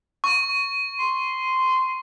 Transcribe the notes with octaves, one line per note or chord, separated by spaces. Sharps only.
C#6
C6